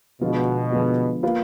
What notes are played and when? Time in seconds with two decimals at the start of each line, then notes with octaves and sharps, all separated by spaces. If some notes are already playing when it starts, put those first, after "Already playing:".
0.21 B2 D3 F3 G#3 B3 F4
0.72 D3 F3 G#3 B3 F4
1.23 A#3 F4 B4 F5